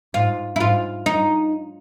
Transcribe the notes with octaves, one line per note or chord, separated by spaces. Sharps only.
G#2 F4
E4
G#2 F4
D#4